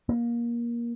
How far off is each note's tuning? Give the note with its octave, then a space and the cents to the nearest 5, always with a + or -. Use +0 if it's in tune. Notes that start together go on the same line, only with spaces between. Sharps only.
A#3 +20